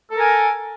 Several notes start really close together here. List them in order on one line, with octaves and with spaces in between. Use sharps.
A4 A#4 G#5